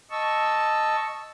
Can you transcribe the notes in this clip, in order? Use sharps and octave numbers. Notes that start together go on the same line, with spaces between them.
D#5 A5 C#6 E6